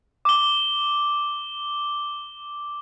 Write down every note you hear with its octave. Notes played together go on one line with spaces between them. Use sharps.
D6 G7